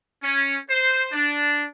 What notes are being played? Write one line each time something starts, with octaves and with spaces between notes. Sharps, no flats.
C#4
C5
D4